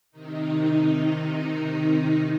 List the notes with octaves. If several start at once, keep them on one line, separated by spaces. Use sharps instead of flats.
C3 D#3 D#4